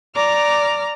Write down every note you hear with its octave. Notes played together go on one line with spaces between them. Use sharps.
D5 A#5 D6 F6